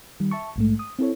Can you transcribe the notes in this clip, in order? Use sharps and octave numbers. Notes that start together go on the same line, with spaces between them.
D#3 G3
E5 A5 C#6
A#1 G#2 A3
D#6
C4 E4 A4 C#5